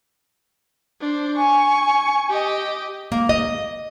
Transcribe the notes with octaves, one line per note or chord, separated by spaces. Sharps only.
D4 C5
G#5 C#6
G4 D#5
A#3
D#5